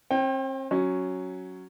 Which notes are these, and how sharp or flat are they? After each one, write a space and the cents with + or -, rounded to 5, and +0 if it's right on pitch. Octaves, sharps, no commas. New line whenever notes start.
C4 +40 G5 +0
F#3 +0 C#4 +0